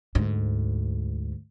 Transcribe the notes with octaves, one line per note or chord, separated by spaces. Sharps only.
D2 G#2